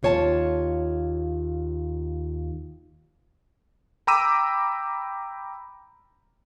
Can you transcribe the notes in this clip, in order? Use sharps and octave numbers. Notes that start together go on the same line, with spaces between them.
D#2 F4 C#5 G#5 A5
G5 A#5 B5 D6 E6 D#7